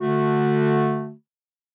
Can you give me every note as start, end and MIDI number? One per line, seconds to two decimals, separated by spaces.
0.01 1.13 50
0.01 1.13 57
0.01 1.13 66